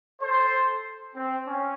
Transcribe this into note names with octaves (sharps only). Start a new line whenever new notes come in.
A4 C5
C4
C#4